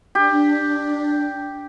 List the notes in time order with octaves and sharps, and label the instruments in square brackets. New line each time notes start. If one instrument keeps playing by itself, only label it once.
[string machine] D4 [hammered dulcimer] G4